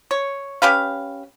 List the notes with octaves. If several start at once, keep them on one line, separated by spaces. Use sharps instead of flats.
C#5
C#4 G4 B4 F5